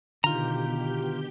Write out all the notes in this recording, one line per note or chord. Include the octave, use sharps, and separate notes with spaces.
B2 D3 D#3 F4 G4 A#5 G6